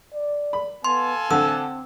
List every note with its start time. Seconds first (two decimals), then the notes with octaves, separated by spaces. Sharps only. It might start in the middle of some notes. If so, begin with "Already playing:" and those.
0.14 D5
0.53 B5
0.84 B3 A4 F5 G#5 C6
1.31 D3 C4 E6